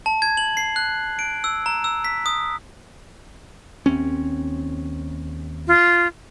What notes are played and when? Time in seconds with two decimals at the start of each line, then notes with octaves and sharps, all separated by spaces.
0.06 A5
0.22 G#6
0.37 F#7
0.57 C7
0.76 F#6
1.19 D7
1.44 E6
1.66 A#5
1.84 E6
2.04 B6
2.26 D#6
3.86 D#2 C4 C#4
5.67 F4